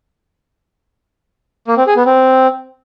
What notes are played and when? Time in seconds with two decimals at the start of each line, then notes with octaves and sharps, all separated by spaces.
1.68 A#3
1.77 C4
1.87 G#4
1.97 B3
2.06 C4